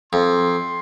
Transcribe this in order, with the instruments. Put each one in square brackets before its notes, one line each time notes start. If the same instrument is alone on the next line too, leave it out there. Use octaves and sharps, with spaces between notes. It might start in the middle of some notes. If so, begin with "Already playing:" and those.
[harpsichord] F2 [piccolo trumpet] C6